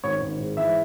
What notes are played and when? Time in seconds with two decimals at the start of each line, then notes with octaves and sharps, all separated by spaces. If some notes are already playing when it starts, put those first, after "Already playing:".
0.04 G#1 C#5
0.22 G#1
0.39 G#2
0.57 E3 E5